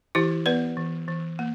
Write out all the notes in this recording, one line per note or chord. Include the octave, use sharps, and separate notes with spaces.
E3 E4 G4
B3 B4 D5
E3
E3
A#3